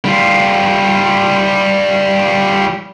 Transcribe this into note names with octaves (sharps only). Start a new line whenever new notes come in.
G3 F4